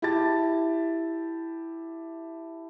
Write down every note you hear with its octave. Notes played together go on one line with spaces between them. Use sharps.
E4 G4 E5 A5 A6